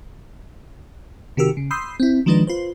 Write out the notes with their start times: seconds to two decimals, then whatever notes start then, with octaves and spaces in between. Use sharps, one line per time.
1.37 C3 D#3 F#4 G4 A#4 E6
1.57 C#3
1.71 B5 C6 D#6 E6 G6 C7
2.00 C4 E4
2.26 D#3 F3 G#3 D4 D#4 B4
2.47 F4 B4 C5